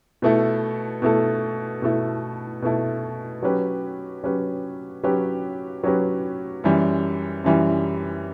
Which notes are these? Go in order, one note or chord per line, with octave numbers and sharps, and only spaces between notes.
B2 A3 E4 A4
B2 A3 E4 A4
B2 A3 E4 A4
B2 A3 E4 A4
F#3 C#4 G4 B4
F#3 C#4 G4 B4
F#3 C#4 G4 B4
F#3 C#4 G4 B4
F#2 E3 G3
F#2 E3 G3